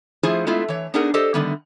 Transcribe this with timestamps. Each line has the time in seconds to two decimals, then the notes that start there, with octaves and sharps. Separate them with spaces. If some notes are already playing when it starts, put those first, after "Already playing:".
0.23 F3 A3 E4 F4 G#4 C5
0.47 G#3 A3 B3 E4 F4
0.68 E3 C#5
0.94 B3 D4 D#4 G#4 A#4 F#5
1.14 G4 A4 C5 D5 D#5
1.34 D3 D#3 G3 A3 B3